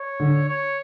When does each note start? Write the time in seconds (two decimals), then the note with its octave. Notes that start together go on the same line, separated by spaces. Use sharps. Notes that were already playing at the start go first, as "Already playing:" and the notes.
Already playing: C#5
0.20 D3
0.49 C#5